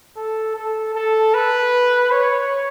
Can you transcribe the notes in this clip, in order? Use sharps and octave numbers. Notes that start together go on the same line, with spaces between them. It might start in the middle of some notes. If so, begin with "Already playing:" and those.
A4
A4
A4
B4
C#5